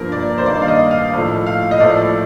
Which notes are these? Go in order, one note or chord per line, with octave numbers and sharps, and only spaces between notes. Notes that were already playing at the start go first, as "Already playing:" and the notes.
Already playing: G2 F3 A#3 A#4
D5
C5
G2 D#3 G3 A#3 D5
F5
D#5
F5
A2 F3 A3
F5
D#5
A2 F3 A3 D5